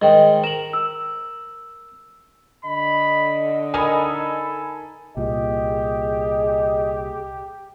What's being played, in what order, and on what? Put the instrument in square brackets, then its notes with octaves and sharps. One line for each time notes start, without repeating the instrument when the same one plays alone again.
[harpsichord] G#2 D#3 [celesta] D#5 G5
[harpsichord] A#4 [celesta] E7 F#7
[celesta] E6
[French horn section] D3 D#5 [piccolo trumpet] B5
[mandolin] D#4 A#4 D#6 [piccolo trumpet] A4 [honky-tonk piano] G#5 B5
[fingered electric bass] C2 A#2 [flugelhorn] G4 [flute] G#4 [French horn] D#5